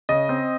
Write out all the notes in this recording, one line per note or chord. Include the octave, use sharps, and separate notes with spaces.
C#3 D#5
C4